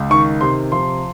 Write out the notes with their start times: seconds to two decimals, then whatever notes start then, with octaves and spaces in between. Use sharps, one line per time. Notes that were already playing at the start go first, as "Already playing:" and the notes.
Already playing: C#2
0.10 D#3 C#6
0.41 C3 C6
0.72 F3 C6